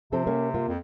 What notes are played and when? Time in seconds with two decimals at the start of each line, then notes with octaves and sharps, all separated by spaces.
0.12 C3 F3 C4 A4
0.27 A#3 C#4
0.54 A#3 F4
0.68 F2